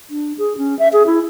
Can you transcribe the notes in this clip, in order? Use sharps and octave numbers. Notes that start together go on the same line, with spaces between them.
D4
G#4
C#4
E5
G#4
E4